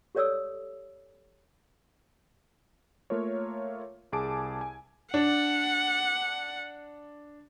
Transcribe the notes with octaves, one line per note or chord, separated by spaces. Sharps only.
G4 A4 C#5 D5 D#6 E6
A3 A#3 F4 A#4 C#5
C2 G#4 G#5 A5 D6 D7
G#5
D4 F#5